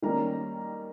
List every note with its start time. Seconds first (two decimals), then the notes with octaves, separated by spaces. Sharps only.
0.02 D#3 G3 A#3 C#4 A#5